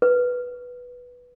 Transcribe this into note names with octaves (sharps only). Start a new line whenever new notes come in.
B4